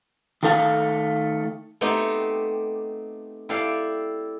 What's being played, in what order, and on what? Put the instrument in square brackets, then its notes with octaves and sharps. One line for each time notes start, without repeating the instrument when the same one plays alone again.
[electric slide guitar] D#3 A3 A4 F5
[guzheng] A3 B3 C4 D#4 G4
E4 G4 A4 D5 F5